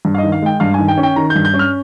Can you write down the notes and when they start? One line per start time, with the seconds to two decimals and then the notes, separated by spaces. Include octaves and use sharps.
0.05 G2
0.14 F5
0.18 D#5
0.23 D#3
0.32 F5
0.42 G#3 G5
0.60 G2 F5
0.74 D#3 G#5
0.88 G5
0.98 C#4
1.03 G5
1.16 D#3 A#5
1.30 G6
1.36 G2
1.45 G6
1.54 C#4
1.59 F6